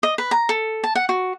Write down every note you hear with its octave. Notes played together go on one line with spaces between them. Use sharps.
D#5
B4
A#5
A4
A5
F#5
F#4